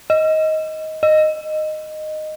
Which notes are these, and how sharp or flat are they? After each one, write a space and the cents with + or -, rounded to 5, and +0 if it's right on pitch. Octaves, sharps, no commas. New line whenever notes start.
D#5 +15
D#5 -10